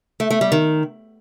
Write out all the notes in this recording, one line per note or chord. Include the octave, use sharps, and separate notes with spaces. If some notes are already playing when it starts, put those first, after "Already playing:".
A3
A3
G3
D#3